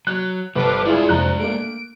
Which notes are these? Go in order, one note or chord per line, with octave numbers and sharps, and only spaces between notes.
F#3 F#6
G1 F3 A4 B4 C5 D6
G#3 D4 E4 F4 G#4 D5
C2 F2 F3 A#5 F#6
A3 A#3 D7